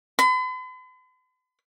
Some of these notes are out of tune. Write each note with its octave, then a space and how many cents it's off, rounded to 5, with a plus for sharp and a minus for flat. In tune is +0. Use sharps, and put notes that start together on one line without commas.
B5 +45